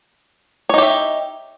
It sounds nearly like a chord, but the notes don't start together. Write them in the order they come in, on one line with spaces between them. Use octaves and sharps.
C#5 D#4 G4 E5